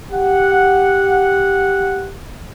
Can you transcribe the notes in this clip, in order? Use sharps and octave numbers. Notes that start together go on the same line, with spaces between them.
G4 F#5